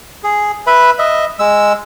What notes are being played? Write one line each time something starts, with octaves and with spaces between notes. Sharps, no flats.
G#4
B4 E5 B5
D#5 E5
G#3 E6